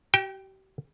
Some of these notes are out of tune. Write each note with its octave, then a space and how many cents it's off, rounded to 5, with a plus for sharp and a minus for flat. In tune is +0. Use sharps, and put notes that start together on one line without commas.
G4 -40 G5 +0